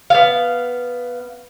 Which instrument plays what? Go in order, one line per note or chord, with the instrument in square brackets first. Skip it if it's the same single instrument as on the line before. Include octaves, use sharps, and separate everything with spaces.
[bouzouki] B3 F5